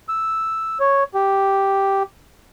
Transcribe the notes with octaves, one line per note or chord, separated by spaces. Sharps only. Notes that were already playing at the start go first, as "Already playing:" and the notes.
E6
C#5
G4